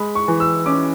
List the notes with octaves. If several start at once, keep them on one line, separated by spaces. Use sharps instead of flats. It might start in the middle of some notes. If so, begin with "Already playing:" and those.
Already playing: G#3 B5
C#6
E3
E6
C#4 D6